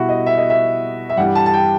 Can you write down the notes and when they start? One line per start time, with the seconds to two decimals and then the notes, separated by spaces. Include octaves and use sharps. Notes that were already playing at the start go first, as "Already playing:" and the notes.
Already playing: B2 G3 E4 F#4
0.09 D#5
0.26 E5
0.38 D#5
0.50 E5
1.10 E5
1.17 G2 E3 G3 F#5
1.35 A5
1.46 A5
1.54 G5